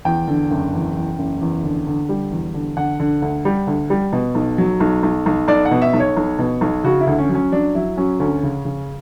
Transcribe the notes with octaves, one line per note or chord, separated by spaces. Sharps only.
E2 G5
D3
F#1
E2
E2
F#1
E2
D3
D3
G3
E2
D3
D3 F#5
D3
D2
G3
D2
G3
B2
B1
F#3
B1
B1
B1
B1 D5
F#5
B2
E5
B1
C#5
B1
B2
B1
C#3 F#4
E4
D2
C#4
F#3
C#4
F#3 D4
F#3 E4
F#3 C#4
D2 C#4
C#3
C#3